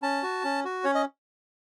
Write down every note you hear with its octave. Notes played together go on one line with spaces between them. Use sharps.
C#4 A5
F#4
C#4
F#4
C#4 C#5
D#5